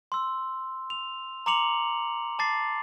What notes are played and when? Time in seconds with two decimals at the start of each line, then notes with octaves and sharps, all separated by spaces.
0.12 C6 E6
0.90 F7
1.46 A#5 C6 D6 C#7 F7 F#7
2.39 A5 D6 A6 C7